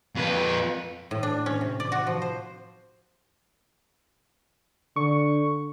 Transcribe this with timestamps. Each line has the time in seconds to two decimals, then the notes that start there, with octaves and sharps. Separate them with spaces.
0.15 F2 B4
1.11 A2
1.23 D4
1.46 C#4
1.61 C3
1.80 D5
1.92 F#4
2.07 F3
2.22 C5
4.96 D3 C#6